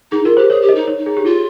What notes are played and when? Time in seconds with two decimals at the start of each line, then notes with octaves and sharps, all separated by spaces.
0.12 D#4 G#4
0.24 F4 A#4
0.37 G4 C5
0.50 G#4 C#5
0.62 G4
0.69 D#5
0.75 D#4
0.87 C#5
0.97 D#4
1.06 G#4
1.17 G4
1.25 F4 G#4